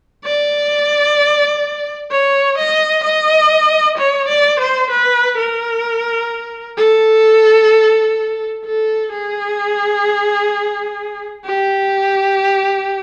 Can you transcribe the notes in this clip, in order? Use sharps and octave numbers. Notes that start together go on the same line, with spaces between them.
D5
C#5
D#5
D#5
C#5
D5
C5
B4
A#4
A4
A4
G#4
G4